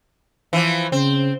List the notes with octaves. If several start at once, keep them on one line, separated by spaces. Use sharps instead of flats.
E3 F3
C#3 C4